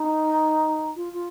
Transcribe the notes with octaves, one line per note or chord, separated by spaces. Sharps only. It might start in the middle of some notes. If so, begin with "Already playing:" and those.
Already playing: D#4
F4
F4